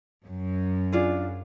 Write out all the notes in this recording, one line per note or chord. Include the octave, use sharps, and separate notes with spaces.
F#2
D4 F4 G#4